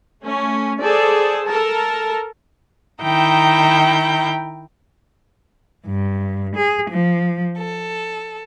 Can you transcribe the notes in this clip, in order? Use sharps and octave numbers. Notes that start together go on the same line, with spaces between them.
A3 C#4
G#4 A4 C5 D5
A4 A#4 A5
D#3 E4 G5 A#5 G6
G2
G#4
F3
A4